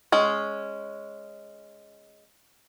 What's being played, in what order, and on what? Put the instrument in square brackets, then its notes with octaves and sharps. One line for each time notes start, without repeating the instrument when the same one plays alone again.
[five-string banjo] G#3 C#4